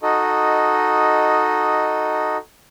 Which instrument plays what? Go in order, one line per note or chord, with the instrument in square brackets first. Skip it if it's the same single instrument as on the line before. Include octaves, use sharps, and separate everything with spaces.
[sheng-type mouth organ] D#4 F#4 A4 D#5